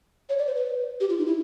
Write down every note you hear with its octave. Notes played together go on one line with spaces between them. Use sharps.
C#5
D5
C5
B4
G4
F4
D#4
E4